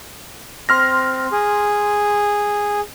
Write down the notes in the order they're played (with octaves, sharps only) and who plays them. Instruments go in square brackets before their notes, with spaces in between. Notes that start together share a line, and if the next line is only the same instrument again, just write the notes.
[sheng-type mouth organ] C4 [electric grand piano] C6 F6 A#6
[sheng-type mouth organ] G#4